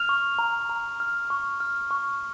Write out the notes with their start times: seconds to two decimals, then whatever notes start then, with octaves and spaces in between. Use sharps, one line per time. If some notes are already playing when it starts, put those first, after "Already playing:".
Already playing: F6 F7
0.09 C#6
0.39 A#5
0.69 A#5
1.00 F6
1.30 C#6
1.60 F6
1.91 C#6